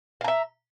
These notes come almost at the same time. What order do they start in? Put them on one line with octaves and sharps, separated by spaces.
F5 A#5 E5